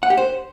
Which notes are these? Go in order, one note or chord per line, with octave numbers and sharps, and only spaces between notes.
F#5
G4
C5